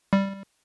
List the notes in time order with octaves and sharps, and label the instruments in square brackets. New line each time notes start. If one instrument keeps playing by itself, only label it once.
[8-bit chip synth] G3